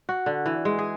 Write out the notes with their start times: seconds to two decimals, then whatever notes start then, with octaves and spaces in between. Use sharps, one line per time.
0.09 F#4
0.26 D3
0.46 E3
0.65 G#3
0.79 G#4